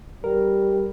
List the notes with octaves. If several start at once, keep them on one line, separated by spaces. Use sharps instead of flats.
G3 A#4